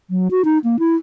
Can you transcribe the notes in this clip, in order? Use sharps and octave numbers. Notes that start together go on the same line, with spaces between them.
F#3
F#4
D#4
A#3
E4